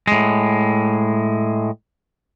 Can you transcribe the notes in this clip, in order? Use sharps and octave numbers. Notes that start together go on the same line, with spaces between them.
A2 G#3